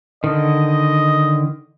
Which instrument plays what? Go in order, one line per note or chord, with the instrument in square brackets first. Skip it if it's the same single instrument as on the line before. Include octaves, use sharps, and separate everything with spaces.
[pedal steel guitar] D3 D#3 [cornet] D#5